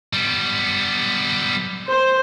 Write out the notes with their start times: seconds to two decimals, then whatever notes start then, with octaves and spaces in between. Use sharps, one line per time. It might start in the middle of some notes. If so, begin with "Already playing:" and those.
0.13 G3 B3
1.89 C5